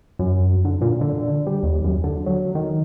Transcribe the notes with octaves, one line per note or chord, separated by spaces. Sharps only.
F#2
D3
A#2
D3
G3
D#2
F#2
D3
F#3
D#3